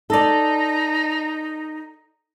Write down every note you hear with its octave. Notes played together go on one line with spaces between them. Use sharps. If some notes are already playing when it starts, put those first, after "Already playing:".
D#4 A4 D5